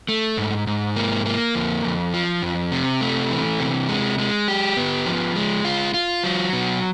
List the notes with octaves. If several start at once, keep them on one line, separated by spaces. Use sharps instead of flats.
A3
G#2
G#2
A#3
A#3
F2
F2
F3
F2
C3
A3
E3
C3
G#3
G#3
G4
B3
F3
G#3
F4
F4
F#3
B2